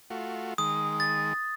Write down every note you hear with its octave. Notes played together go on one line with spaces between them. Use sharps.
A3 F4 F#4
D#3 G#3 D#6
A6